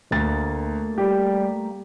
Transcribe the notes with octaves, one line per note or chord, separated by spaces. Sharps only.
D2 A3 A#3 A6
G3 G4